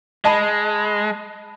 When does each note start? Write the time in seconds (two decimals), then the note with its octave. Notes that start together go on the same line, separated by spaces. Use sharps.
0.25 G#3 D#5 A5 B5